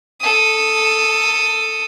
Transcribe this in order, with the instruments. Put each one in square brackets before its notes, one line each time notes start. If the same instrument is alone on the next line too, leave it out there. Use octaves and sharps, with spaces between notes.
[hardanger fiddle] A4 D#6